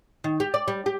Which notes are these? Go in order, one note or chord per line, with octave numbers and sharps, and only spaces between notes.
D#3
G4
D5
G3
G4